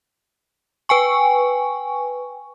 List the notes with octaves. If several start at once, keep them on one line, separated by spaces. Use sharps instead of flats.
B4 G5 G#5 C#6